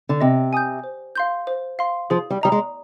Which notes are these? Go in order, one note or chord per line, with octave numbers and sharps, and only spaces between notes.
D3
C3 D#5
G#5 D#6 G6
C5
F5 C6 G6
C5
F5 C6
F3 G#4
G3
G3 D#5 A#5 D#6
G#3